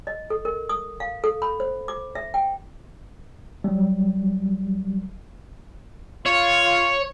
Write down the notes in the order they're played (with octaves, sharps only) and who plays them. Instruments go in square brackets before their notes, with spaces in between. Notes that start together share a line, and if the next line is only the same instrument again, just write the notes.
[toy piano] D#5
A4
A#4
D#6
F5
A4
B5
C5
D6
E5
G5
[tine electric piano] F#3 G3
[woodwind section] F4 [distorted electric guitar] C#5